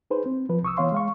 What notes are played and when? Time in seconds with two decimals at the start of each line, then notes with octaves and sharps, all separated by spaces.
0.10 D#4 G#4 B4 C5
0.26 C4
0.49 F3 B4
0.63 C2 C#6 D#6 E6
0.77 E3 B3 C#5 F5 C6
0.92 G#3 F5 C#6